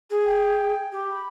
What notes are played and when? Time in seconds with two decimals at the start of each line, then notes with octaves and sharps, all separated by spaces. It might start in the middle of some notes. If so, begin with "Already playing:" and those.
0.10 G#4
0.25 G5
0.92 G4
1.08 B5